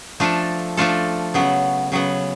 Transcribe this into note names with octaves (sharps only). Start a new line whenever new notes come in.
F3 A3 D4 F4 A4
F3 A3 D4 F4 A4
C#3 F#3 B3
C#3 F#3 B3